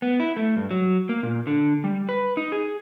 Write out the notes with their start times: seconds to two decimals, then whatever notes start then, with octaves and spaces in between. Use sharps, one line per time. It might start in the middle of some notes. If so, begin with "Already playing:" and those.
0.02 B3
0.20 E4
0.37 A3
0.57 G2
0.71 F#3
1.09 A#3
1.23 A#2
1.47 D3
1.84 G3
2.09 B4
2.37 D#4
2.52 G#4